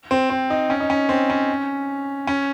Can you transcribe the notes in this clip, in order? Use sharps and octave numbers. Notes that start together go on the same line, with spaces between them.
C4
C4
D#4
C#4
D#4
C#4
C4
C#4
C#4